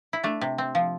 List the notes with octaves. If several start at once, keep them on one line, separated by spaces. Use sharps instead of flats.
E4
A3 D4
C3
C4
F3